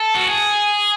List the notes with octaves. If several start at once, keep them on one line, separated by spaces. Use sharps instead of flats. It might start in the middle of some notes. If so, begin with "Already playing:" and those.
Already playing: A4
F#4
G#4